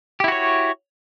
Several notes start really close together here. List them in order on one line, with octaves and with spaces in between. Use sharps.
G4 E4 F#4 C#5